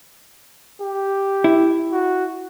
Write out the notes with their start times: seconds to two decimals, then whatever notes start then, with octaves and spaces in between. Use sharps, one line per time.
0.81 G4
1.44 E4
1.92 F#4